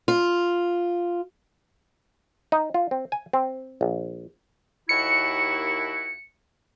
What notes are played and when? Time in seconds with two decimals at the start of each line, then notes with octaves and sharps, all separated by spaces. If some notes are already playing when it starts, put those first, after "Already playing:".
0.08 F4
2.52 D#4
2.74 F4
2.91 C4
3.12 G#5
3.33 C4
3.81 A#1
4.89 D#2 E4 F#4 C#7